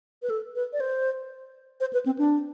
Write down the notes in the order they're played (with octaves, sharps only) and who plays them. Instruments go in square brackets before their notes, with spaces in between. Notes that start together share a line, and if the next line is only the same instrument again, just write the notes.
[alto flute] B4
A4
B4
D5
C5
C5
B4
C4
D4